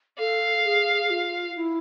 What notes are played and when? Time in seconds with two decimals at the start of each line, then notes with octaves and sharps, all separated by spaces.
0.19 A4 F5
0.65 G#4
1.06 G#4
1.10 F4
1.56 E4